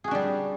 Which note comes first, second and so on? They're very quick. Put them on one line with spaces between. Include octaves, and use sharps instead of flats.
G#4 F#4 D4 G3